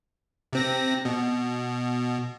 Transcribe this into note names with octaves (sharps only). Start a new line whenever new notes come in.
C3 C4 A#6
B2